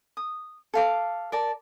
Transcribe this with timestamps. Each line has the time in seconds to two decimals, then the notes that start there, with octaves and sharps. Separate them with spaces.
0.17 D#6
0.74 A4 F5 D6
1.32 A#4 D5 A5